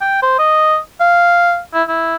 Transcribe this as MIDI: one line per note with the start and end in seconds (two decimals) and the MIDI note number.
0.01 0.22 79
0.22 0.37 72
0.38 0.77 75
1.00 1.59 77
1.74 1.83 64
1.88 2.16 64